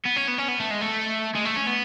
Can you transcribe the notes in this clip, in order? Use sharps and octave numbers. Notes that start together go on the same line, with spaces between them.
B3
C#4
B3
C#4
B3
A3
G#3
A3
G#3
A3
C#4
B3